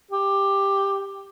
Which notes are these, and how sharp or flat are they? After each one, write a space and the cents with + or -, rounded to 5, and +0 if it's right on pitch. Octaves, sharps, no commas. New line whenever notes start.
G4 +10